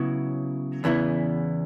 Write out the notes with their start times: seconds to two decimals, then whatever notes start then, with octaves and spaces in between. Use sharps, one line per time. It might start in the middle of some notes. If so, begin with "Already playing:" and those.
Already playing: C#3 F#3 B3 E4
0.84 E2 C#3 E3 B3 E4